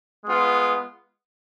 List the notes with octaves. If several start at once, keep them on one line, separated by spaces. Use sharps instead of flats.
G#3 B3 F4